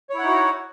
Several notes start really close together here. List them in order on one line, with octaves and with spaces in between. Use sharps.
C#5 E4 F#5 D#4 F#4